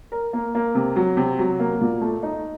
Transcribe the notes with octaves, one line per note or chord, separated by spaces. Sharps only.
A#4
A#3
A#3
C3
F#3
C3
F#3
A#3
A#2
A3
D#4